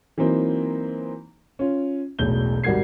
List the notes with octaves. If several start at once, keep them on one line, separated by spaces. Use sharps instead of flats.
E3 F#3 A#3 C4 D#4
C#4 F4
E1 B1 A2 G6 G7
G#1 G3 F#4 A#4 G#6 C7